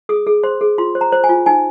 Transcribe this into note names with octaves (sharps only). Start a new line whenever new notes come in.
G#4 D#6
G#4
C5 C6
G#4
F4 C6
C5
A#5
C5
G#5
F4
D#4 G#5